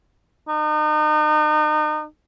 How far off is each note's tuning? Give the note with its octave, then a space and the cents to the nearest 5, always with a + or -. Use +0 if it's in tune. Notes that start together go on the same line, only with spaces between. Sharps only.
D#4 -35